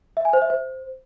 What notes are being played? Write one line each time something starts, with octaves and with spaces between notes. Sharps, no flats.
E5
G#5
C5
E5
C5